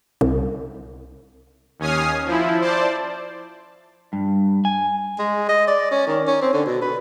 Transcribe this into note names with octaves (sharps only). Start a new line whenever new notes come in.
C2
D#2 C#4 G#5 D#6 F6 C7
F3 E4
C5 D5 A5
G2
G#5
G#3
D#5
D5
C#4
D#3
C#4
C4
D3
B2
B4